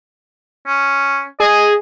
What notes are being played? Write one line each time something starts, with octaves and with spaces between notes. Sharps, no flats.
C#4
G#4 D#5